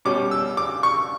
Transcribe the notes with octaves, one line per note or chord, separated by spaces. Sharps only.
B2 G3 C#4 D6
E6
D6
C#6